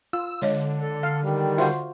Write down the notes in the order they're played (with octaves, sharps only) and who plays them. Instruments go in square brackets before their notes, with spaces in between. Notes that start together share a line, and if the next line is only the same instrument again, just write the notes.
[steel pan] F4 [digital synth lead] E6
[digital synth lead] D3 [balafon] G#3 C#5 D#5
[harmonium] A4
[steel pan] F5
[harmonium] D#3 G3
[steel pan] F4 F#4 C5 [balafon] E5 F#5